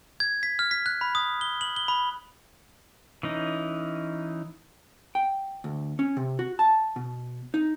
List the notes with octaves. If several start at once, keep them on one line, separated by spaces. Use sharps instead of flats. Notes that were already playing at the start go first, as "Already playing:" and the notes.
G#6
B6
F6
B6
F#6
B5
D#6
G7
F#7
G7
B5
E3 C#4 D#4
G5
D2
C#4
C3
F#4
A5
B2
D#4